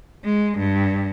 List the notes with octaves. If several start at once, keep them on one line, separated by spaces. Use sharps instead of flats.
G#3
G2